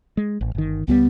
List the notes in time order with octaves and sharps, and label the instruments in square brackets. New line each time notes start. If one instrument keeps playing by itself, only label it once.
[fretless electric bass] G#3
A1
G1 D#3
[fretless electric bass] C#2 F3 G3 [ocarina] B3